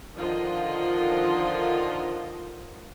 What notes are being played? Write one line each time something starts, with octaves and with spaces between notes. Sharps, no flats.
D3 D#3 F3 F4 D#5